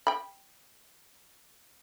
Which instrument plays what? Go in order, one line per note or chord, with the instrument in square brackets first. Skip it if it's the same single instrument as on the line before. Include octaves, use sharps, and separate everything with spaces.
[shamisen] G5 B5